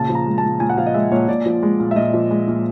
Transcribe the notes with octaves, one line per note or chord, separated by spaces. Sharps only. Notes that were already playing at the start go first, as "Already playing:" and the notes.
Already playing: A#2 C#3 A5
F3
A#5
G#3
A5
A#2
A#2 G#5
F#5
F3 F5
D#5
G#3 E5
A#2 C#5
A#2 D5
F3
G#3
A#2
E5
A#2 D#5
F3
G#3
A#2